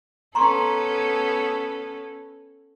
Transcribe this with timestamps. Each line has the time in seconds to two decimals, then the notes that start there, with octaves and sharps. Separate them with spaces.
0.35 B3 C#4 A4 A#5 C6 C#6